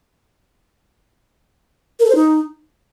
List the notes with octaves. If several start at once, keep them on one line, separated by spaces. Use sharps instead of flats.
A#4
A4
C5
D#4